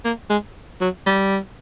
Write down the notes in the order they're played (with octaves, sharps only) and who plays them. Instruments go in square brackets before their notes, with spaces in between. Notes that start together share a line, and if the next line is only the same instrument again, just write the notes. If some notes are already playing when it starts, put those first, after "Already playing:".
[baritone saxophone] A#3
G#3
F#3
G3